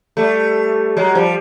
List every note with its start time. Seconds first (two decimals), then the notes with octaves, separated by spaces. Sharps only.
0.17 G3 A3
0.97 F#3 G#3
1.15 F3 G3